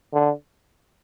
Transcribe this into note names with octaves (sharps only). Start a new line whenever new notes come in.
D3